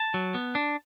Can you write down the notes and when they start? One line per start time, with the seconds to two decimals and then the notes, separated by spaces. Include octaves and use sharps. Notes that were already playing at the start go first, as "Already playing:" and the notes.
Already playing: A5
0.14 F#3
0.34 B3
0.55 D4